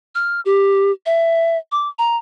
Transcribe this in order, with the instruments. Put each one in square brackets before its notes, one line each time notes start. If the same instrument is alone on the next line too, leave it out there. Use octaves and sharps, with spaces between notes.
[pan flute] F6
G4
E5
D6
A#5